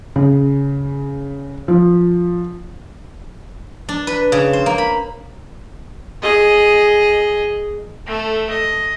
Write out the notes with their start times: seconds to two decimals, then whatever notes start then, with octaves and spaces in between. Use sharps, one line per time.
0.16 C#3
1.68 F3
3.89 D4
4.07 B4
4.32 C#3
4.53 C5
4.66 A#3
4.78 B5
6.22 G#4 D#5
8.06 A3 A4
8.50 D#5